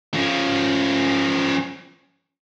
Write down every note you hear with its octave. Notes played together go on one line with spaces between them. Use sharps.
F3 C#4